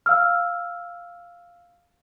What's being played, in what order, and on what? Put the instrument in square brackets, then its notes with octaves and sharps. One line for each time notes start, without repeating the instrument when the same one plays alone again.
[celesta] F5 E6 F6